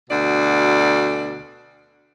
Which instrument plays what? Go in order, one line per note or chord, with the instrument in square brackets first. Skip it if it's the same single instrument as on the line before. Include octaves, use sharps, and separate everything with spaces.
[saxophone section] D2 B2 D5